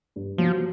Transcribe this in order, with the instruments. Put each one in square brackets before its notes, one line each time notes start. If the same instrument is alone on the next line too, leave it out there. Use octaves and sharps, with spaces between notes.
[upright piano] G2
[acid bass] F3 [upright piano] F#3